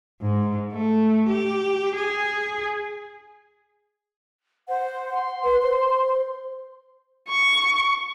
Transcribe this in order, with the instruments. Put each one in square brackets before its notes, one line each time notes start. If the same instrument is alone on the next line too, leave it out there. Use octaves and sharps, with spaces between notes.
[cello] G#2
A3
G4
G#4
[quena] C5 [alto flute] F#5
[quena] C6
[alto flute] B4
C5
[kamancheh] C#6